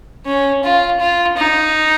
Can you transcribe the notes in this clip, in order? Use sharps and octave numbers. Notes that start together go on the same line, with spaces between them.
C#4
F4
F4
D#4